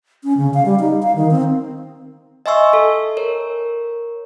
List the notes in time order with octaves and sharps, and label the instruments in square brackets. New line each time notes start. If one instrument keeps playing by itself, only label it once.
[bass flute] C#4
C#3
F5
G3
D#4
F5
D#3
C4
[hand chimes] D#5 E5 G#5 C6 C#6 E6
A4
A#4 C#5